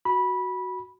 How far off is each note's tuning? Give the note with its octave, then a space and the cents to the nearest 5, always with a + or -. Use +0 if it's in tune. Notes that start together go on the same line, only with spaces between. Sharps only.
F#4 +0 B5 -15